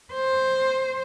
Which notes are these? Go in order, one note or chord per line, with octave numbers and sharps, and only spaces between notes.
C5